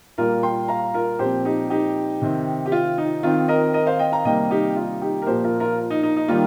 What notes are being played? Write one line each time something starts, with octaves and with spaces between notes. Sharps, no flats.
A#2 G3 A#3 F4 A#4
G5 C6
F5 A#5
F4 A#4
A#2 F3 C4 G4 C5
D#4 G4
D#4 G4
C3 D#3 C4
G4
F4
D#4
D#3 C4 F4
A#4 D#5
A#4 D#5
C5 F5
D#5 G5
F5 A#5
C3 D#3 G3 A#3 D#5 G5
D#4 G4
F4
D#4 G4
A#4
A#2 F3 A#3 G4 C5
F4 A#4
F4 A#4
D#4
D#4
D#4
D#3 G3 A#3 F4